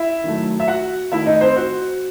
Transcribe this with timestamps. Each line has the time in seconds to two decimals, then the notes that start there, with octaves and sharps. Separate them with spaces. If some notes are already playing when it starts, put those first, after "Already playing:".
Already playing: E4 E5
0.24 D#3 F#3 A3
0.60 E5
0.68 F#4 F#5
1.12 D#3 A3 E4 E5
1.26 D#4 D#5
1.41 C4 C5
1.56 F#4